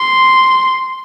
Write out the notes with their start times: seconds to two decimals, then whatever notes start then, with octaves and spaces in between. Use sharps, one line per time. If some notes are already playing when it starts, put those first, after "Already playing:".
Already playing: C6